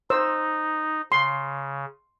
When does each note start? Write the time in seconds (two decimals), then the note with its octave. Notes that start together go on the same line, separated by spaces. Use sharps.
0.10 D#4 C5 E6
1.12 C#3 C6